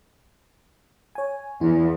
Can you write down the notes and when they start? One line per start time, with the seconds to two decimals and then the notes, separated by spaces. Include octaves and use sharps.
1.15 C#5 G#5
1.61 E2 E4